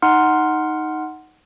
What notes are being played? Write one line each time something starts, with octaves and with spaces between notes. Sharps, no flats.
D#4 F#5 C6 F6